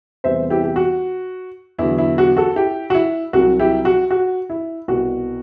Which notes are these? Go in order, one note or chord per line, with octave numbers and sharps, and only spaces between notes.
E2 C3 E3 G3 C5 E5
E4 G4
G4
F#4
E2 D3 F#3 E4
E4
F#4
F#4 A4
E4 G4
F#4
E4
C2 C3 F#3 F#4
E4 G4
F#4
F#4
E4
C2 B2 G3 F#4